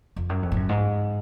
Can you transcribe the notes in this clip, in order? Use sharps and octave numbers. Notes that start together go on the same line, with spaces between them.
F2
F#2
F2
G#2
F#2
G#2